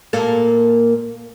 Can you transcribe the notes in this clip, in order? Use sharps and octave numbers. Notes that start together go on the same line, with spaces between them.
A#2 A#3 A4